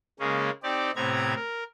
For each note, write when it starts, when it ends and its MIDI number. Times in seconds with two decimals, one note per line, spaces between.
0.19 0.50 49
0.19 0.50 56
0.19 0.50 58
0.19 0.50 61
0.63 0.91 60
0.63 0.91 63
0.63 0.91 67
0.63 0.91 74
0.96 1.34 45
0.96 1.34 48
0.96 1.34 59
0.96 1.34 60
0.96 1.34 82
0.96 1.34 92
1.35 1.64 70